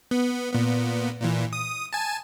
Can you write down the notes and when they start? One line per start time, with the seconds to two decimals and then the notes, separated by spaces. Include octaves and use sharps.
0.11 B3
0.53 A#2 B3
1.21 A#2 E3
1.53 D#6
1.93 G#5 A5